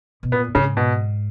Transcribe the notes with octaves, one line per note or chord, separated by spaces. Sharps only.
B2
A#2 B3
G#2 C#3
B2